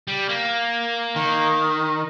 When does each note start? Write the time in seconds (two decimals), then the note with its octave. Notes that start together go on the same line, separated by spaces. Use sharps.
0.08 G3
0.29 A#3
1.16 D#3